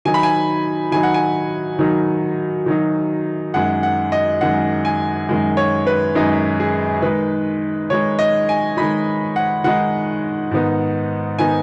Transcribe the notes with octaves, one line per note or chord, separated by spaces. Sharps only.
D#3 F#3 D#4 G#5
B5
G#5
D#3 F#3 D#4 G#5
F#5
G#5
D#3 F#3 D#4
D#3 F#3 D#4
F#2 D#3 G#3 F#5
F#5
D#5
F#2 D#3 G#3 F#5
G#5
F#2 D#3 G#3
C#5
B4
F#2 D#3 G#3 D#4
G#4
D#3 G#3 D#4 B4
D#3 G#3 D#4 C#5
D#5
G#5
D#3 G#3 D#4 B5
F#5
D#3 G#3 D#4 F#5
G#2 D#3 B3 D#4
D#3 B3 D#4 G#5